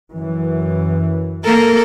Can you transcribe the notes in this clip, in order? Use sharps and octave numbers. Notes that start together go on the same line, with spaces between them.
F#2 E3
A#3 A4 A#4